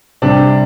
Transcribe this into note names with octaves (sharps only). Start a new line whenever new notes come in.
C3 G3 C4 D4